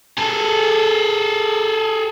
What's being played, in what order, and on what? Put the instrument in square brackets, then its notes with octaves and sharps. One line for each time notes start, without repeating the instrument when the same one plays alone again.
[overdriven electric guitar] G#4 A4